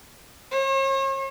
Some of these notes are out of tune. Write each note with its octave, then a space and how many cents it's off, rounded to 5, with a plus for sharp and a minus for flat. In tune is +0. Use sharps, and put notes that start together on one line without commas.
C#5 -45